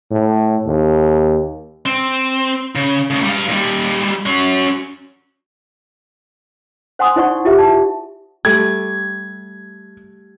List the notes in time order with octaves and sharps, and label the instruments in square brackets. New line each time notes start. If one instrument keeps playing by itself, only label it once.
[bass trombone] A2
D#2
[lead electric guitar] C4
C#3
A2 C#3
G3 F5
D#2 G3
C#4 F#4
[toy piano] C5 F#5 G#5 C6 D#6
D#4 E4 C5 D5 F#5 C#6
E4 F4 G4 E5
A5
[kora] G3 A3 [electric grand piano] G#6